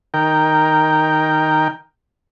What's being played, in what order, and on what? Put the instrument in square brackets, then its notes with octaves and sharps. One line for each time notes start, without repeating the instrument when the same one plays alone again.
[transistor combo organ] D#3 A#4 G5